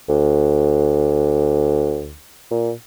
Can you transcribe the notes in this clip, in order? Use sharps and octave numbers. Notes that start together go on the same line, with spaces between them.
D2
A#2